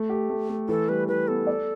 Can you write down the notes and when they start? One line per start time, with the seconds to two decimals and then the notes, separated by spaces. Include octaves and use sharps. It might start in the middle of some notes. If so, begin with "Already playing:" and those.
Already playing: A3
0.09 G4
0.29 A3
0.49 A3
0.69 E3 A4
0.88 G3 B4
1.08 E3 B4
1.28 B3 A4
1.47 D5